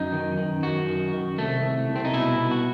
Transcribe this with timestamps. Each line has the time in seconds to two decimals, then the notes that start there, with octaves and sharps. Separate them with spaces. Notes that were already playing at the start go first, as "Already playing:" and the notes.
Already playing: F#2 D#4
0.12 D#3
0.38 D#3
0.63 F#2 F#4
0.88 D#3
1.12 D#3
1.38 C2 A3
1.63 C2
1.89 C2
1.96 C4
2.05 D#4
2.13 B2 E4
2.39 B2
2.51 F#4